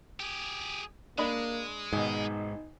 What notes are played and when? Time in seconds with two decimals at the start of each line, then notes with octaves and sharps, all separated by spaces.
0.20 G4 G#4
1.18 G#3 A#3 D4 D#5 B5
1.93 G#1 G#2 B2 D#4